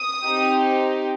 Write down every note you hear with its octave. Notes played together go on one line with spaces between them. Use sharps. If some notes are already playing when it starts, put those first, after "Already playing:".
Already playing: D#6
C4 D#4 G4